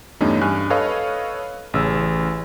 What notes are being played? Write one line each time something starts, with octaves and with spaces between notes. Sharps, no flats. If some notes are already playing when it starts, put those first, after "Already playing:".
E2 G2 A3 C#4 D#4
G2 G#5 F6 F#6
A4 B4 C#5 D#5 F5
A1 C#3 E6